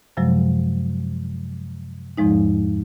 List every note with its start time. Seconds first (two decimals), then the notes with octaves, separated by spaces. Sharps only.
0.17 F#2 C3 F3 F#3 G#3
2.17 E2 G#2 F3 G#3 D#4